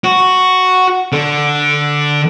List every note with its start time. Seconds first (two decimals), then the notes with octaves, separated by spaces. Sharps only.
0.04 F#4
1.12 D3